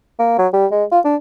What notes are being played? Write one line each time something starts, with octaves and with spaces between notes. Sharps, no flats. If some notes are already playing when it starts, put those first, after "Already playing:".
A#3
F#3
G3
G#3
F4
D4